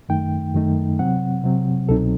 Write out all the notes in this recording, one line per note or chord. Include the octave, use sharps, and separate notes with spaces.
F#2 D#3 A3 D#4 G5
F#2 D#3 A3 D#4
C3 F#3 C4 F#5
C3 F#3 C4
C2 B2 F#3 C4 D#4 A4